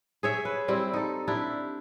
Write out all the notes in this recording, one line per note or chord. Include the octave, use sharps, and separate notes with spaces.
G#4 C#5 E5
B4
G3 C4 E4
D#4 A4
D4 E4 G4